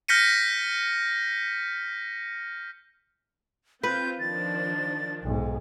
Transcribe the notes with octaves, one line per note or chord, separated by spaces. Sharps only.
F6 G6 A#6 B6 C#7 D#7
C4 F4 B4 G6
D#3 F3 D4 A6
B1 G#2